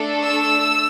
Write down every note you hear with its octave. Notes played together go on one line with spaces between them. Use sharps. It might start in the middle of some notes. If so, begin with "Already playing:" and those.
Already playing: A3 D4 A4
E6